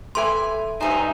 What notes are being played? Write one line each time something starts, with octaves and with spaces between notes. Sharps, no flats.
A4 B4 E5 G#5 C6
G2 D#4 C5 E5 G#5